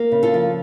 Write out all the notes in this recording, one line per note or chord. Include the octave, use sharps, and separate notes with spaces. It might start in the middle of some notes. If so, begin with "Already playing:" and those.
Already playing: A#3
C#3
F4 A4
F3